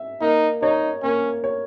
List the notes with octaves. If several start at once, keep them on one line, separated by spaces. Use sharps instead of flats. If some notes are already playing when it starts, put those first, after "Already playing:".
Already playing: E5
A#3 D#4
D#4 C#5
A#3 C#4
C#5